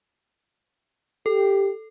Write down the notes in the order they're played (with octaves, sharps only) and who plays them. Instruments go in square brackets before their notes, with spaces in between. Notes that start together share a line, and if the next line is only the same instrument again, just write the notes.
[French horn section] G4 [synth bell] A4